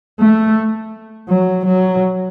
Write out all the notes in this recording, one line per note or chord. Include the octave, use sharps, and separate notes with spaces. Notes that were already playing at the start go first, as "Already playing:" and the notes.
A3
F#3
F#3